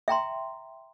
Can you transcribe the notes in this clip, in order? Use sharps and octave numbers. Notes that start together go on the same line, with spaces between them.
E5 G5 A#5 C6